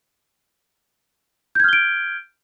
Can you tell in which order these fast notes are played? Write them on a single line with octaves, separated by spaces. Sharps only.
G6 G#6 F6 G7 D7